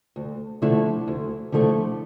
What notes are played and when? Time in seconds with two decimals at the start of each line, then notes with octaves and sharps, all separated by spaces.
0.16 D2
0.62 D3 F3 A3 E4
1.08 D2
1.52 D3 F3 A3 E4